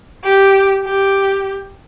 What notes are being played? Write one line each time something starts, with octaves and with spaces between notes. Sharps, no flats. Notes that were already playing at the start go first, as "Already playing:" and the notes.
G4
G4